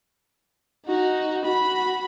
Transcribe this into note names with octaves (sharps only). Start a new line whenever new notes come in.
D#4 F#4
F#4 B5